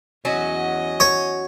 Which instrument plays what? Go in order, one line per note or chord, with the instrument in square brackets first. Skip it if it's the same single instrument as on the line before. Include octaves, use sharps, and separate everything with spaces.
[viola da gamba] E2 D#5 [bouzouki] F#3 C#4 F#4
[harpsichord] C#5